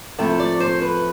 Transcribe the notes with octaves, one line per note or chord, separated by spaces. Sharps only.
C3 F3 A3 C4 E4
D5
C5
B4